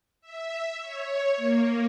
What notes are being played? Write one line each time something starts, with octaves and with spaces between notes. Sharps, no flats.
E5
C#5
A#3